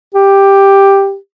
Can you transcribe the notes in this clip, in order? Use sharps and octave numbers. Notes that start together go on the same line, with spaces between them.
G4